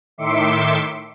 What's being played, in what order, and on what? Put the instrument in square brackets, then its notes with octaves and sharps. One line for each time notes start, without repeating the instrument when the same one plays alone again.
[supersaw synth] A2 D#3 E5 C6 D6 C#7